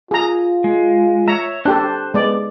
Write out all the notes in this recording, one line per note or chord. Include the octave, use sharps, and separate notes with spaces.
F4 G#4 A#5
G#3
C#5 E5 A#5
D4 G4 A4 C5 A5 F#6
G#3 B3 D5